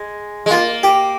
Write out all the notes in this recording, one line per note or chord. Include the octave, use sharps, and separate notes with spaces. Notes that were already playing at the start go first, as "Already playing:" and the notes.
Already playing: G#3
G#3
A#3 F4
G4